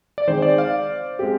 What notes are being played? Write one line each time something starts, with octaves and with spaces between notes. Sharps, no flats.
D5
D#3 G#3 C4 C5
D5
F5
G#3 C4 G4